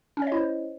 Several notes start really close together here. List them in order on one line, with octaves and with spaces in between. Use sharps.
C#4 C#5 D#5 E4 C5